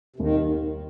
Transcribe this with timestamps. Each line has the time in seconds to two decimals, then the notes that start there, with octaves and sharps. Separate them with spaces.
0.16 C3
0.19 D#2 D#3